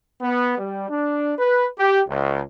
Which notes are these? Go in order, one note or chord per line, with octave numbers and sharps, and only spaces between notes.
B3
G3
D4
B4
G4
C#2